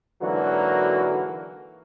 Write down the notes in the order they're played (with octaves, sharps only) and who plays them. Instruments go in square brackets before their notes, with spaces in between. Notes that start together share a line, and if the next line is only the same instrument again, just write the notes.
[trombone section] G#2 D3 E3 F#3 A#3 F#4